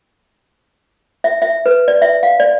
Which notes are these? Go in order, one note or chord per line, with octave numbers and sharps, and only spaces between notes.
E5
E5
B4
D5
E5
F5
D5